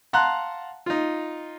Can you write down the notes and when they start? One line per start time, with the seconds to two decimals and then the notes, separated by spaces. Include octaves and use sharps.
0.13 F5 F#5 A5 A#5 C6 F#6
0.86 D#4 F4